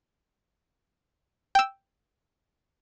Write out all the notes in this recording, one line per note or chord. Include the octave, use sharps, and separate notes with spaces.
G5 E6